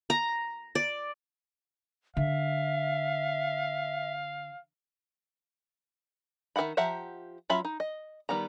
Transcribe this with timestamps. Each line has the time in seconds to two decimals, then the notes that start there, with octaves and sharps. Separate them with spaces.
0.10 A#5
0.75 D5
2.17 D3 E5 F5
6.56 D#3 A4 E5 F#5 B5
6.77 F3 G4 E5 F#5 A#5
7.50 F#3 C#4 F4 E5 B5
7.65 D#4
7.80 D#5
8.29 D#3 G3 B3 A#5